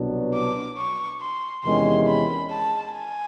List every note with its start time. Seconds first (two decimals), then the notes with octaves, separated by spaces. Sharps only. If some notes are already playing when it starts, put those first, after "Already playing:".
Already playing: C2 B2 F#3 B3 D4
0.34 D6
0.77 C#6
1.21 C6
1.64 E2 C3 D#3 G#3 C#4 C6
2.07 B5
2.51 A5
2.94 G#5